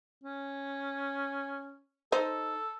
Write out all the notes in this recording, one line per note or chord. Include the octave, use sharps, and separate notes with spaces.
C#4
D#4 A4 C5